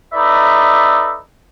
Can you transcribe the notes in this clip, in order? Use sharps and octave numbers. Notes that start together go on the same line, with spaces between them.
D#4 A4 B4 D5 E5